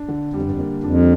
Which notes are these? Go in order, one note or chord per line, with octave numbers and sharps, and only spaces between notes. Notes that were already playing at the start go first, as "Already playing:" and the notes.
Already playing: D4
D3
F2 G3
G2
F2
A#3
F2 D4